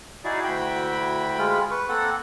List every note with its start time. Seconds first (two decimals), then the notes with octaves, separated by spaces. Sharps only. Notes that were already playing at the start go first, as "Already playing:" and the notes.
0.24 D#4 E4 F#4 G#4 D5
0.44 D2 G5 B5
1.39 G#3 F4
1.71 B4 C#6
1.89 A#3 C4 A4 F#5